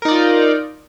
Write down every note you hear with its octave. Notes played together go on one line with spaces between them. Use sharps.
D#4 F4 A#4 D5